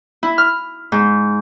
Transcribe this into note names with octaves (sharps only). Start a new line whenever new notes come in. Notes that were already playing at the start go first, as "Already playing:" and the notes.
E4
F6
G#2